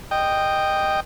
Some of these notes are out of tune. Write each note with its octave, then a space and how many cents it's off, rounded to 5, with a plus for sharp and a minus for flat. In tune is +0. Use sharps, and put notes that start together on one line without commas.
D#5 -10 G5 +0